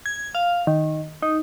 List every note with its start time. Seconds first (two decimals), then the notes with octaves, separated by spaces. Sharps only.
0.06 G#6
0.35 F5
0.67 D#3
1.22 D#4